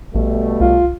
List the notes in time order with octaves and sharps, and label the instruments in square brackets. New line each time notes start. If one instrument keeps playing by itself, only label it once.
[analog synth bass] A#1 [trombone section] B2 G3 A3
[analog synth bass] C2 [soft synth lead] F4